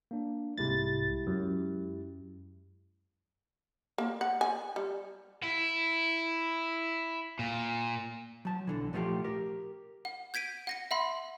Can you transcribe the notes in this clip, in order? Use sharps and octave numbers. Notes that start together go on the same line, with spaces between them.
A#3 D4
C2 G#2 G#3 E4 G4 A6
F#2
A#3
F#5
G#5
G3
E4
A#2
F#3 A5
B1 D3 E3
A#2 F3 A3 B3 F4 G4
G4 A#4
F#5
G6 G#6 B6 D7 D#7
F#5 A#6 C#7
E5 F#5 B5 C6